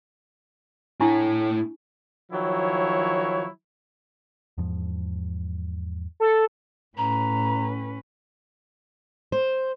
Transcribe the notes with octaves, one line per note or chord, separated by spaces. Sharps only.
A2 A3 D4 E4 C#6
D#3 F3 F#3 E4 C#5
E2 G#2 F3
A4
A2 C#4 B4 A#5
C5